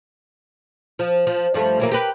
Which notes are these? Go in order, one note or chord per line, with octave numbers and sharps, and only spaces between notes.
F3
F3
G2 F3 A3
E3 F#3 A#3
G4 A#4 B4